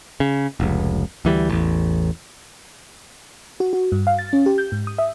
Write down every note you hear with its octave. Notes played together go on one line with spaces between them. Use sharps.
C#3
F1 C#2
D2 E3 G3
A1 E2
F#4
F#4
G2
F5
A6
C#4
G4
G6
G#2
D#6
E5